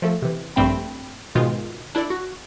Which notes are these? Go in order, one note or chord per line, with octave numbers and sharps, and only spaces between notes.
F3 A3 A4
C3 E3
A#1 G2 A3 C4 G5 B5
G#2 B2 D#3 G#3 F4
D4 E4 A4 D5
F#4